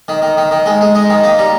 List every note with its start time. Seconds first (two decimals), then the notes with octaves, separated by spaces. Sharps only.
0.08 D#3
0.22 D#3
0.37 D#3
0.51 D#3
0.66 G#3
0.81 G#3
0.95 D#4
1.10 D#3
1.24 A#3
1.39 G3